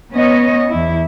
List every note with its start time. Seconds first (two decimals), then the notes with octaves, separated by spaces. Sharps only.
0.12 B3 C#4 C#5 D#5
0.70 E2 E4